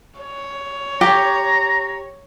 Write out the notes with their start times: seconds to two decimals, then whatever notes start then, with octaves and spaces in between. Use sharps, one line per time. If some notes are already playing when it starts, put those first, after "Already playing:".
0.20 C#5
1.01 G4 A#5